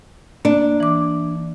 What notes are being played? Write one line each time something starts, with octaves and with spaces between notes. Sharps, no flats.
A#3 D4
E3 D6